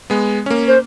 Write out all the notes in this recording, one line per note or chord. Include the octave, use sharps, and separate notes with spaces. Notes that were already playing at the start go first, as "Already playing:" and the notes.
G#3 B3
A#3 C#4
C5